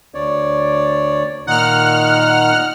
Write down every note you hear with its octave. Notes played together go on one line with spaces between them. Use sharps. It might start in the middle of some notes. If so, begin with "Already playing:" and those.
D2 C#5 D5
A#2 D#3 D#4 F#5 F6